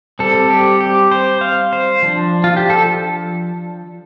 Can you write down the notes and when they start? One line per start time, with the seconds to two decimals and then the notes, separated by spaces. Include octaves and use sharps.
0.19 G3 C4 A4
0.50 G4
0.81 G4
1.12 C5
1.41 F5
1.73 C5
2.02 F3 D4
2.44 F4
2.57 G4
2.70 A4